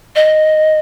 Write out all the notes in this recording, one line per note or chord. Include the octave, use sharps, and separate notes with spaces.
D#5